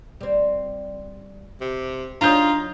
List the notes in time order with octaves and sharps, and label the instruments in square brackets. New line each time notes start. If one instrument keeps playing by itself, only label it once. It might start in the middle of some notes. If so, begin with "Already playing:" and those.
[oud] G3 C4
[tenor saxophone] C3
[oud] F#3 D#4 C#5 [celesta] D4 D#6 [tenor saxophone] F4 [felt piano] A#5 G6